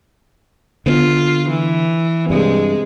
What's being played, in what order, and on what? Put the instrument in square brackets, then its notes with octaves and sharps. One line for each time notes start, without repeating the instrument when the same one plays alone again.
[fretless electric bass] D3 B3 [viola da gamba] F4
[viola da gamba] E3
[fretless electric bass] G2 [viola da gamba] C3 G#3